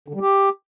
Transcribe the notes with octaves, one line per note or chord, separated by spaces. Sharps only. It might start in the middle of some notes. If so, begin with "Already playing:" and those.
D3
G3
G4